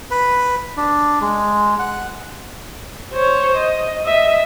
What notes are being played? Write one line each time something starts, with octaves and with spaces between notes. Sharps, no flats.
B4
D4
G#3
F#5
C5 C#5
D#5
D#5 E5